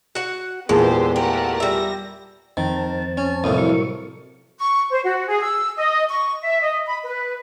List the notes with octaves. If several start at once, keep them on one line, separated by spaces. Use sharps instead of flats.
F#4 F#5
E2 A#2 G#3 B3 G4 C5 A5
A3 G4 A#4 F#5
G3 E5 A#6
F2 D#3 C4 A5
C#4
C2 F2 A2 A#3 D#6
F#3 A#4 C#6
C#6
C5
F#4
G#4
E6
D#5
C#6
E5
D#5
B5
B4